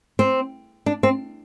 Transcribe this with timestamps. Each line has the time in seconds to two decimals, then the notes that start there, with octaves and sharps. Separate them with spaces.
0.19 C4
0.86 D4
1.03 C4